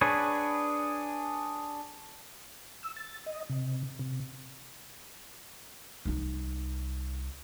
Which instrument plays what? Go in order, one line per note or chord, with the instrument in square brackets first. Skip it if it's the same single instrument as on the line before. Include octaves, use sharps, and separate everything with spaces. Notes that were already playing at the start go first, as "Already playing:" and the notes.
[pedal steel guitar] D4 G#4 B4 C#5
[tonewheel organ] E6
A6
D#5
C3
C3
[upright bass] C2 D#4